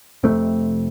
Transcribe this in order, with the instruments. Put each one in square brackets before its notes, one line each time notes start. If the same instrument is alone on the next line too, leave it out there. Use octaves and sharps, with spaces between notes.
[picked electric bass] F1 F2 C3 A3 C4